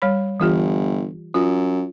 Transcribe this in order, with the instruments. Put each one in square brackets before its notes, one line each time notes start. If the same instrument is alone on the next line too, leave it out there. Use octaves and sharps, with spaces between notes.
[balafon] G3 C#5 B5
[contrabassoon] G1 [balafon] E3 F4 G4
[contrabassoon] F#2 [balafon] F4